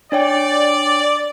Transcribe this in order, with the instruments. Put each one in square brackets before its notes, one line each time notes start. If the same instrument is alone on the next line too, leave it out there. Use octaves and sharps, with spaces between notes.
[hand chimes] D4 C#5 G5 [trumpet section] D5